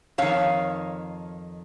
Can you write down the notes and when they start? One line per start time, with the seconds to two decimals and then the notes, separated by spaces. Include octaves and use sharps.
0.18 F2 D#3 C#5 F5